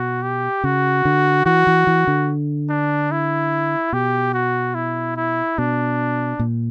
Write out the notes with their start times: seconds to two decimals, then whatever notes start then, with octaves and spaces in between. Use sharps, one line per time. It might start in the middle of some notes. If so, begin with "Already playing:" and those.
Already playing: B2 F#4
0.22 G4
0.64 C#3 F#4
1.05 D3
1.46 E3 F#4
1.67 E3
1.87 E3
2.07 D3
2.69 D4
3.11 E4
3.93 B2 G4
4.34 F#4
4.75 E4
5.16 E4
5.58 B2 D4
6.39 A#2